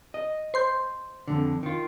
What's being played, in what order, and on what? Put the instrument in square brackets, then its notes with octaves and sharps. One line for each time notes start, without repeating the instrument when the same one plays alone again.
[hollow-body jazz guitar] D#5
[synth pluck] C5 C6 G6
[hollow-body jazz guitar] F2 G#2 D3
D#3 F4